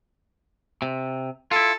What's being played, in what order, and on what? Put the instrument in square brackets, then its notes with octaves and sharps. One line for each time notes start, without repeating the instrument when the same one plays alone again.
[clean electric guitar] C3
[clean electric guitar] E4 F4 [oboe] A4